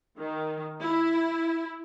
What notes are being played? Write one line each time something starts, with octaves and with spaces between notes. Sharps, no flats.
D#3
E4